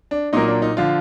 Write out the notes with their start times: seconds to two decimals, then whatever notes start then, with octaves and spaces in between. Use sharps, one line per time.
0.11 D4
0.33 A#2 F#3 A#3 D#4
0.48 D4
0.62 D#4
0.77 D3 F3 F4